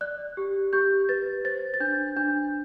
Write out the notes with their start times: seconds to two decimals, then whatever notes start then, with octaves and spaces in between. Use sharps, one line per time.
0.01 D5 F#6
0.37 G4
0.73 G4 G6
1.09 B4 A6
1.45 C5 A6
1.74 A6
1.80 D4 G6
2.17 D4 G6